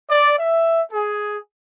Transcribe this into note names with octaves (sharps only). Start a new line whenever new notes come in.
D5
E5
G#4